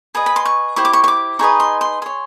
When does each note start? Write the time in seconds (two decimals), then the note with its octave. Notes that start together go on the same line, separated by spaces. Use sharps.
0.15 G#4 B4 D#5
0.26 B5
0.36 C6
0.45 C#6
0.76 E4 G4 C5 C#6
0.85 D6
0.93 C#6
1.04 C#6
1.08 D6
1.39 D#4 G#4 B4 D#5 C#6
1.60 C6
1.81 C6
2.02 G#4 C#5 C6